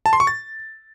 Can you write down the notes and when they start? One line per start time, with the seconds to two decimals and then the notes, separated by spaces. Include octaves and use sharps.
0.06 A5
0.13 C6
0.20 C#6
0.27 A6